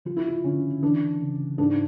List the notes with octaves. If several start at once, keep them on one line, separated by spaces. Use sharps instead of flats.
F3 F4
E4
F4
D3 C#4
E3 D4
C#3
G#2 D4